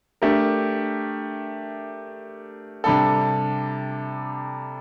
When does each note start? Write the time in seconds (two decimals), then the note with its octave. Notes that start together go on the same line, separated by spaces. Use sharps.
0.22 A3 D4 G4 A#4
2.84 C3 G3 D4 A4